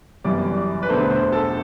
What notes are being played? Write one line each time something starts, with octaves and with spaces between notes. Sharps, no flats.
G1 F#2 E3 G3 D5
B4
E1 E2 D3 A3 C5
C5
A4